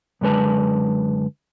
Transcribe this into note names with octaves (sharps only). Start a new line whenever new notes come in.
F#2 D3 G#3 B4 A5